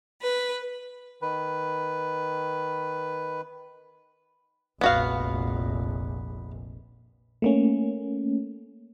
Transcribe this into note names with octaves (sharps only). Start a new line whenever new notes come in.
B4
D#3 B4
F1 A#1 B3 F#4 F5
A3 A#3 C#4